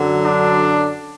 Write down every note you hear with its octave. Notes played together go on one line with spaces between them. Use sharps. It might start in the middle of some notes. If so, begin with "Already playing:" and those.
Already playing: F#2 D3 F#3
D4